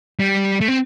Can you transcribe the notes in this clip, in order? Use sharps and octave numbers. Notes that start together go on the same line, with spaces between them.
G3
A3
C4